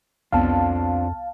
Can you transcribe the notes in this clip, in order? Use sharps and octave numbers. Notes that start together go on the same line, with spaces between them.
C2 F2 B3 C4 D4 F4 F5 A5